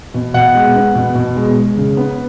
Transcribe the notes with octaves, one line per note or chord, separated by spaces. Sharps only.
B2
B2 F#5
G#3
B3
B2
B2
G#3
G#3
C#3
B3